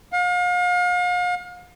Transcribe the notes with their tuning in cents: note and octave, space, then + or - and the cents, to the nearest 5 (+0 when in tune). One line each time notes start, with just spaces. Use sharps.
F5 +40